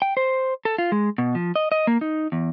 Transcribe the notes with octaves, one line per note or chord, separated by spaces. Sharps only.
G5
C5
A4
F4
G#3
B2
F3
D#5
D#5
A#3
D#4
E2